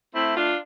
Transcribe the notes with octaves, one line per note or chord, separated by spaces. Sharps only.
A3 C4 E4
D4 F4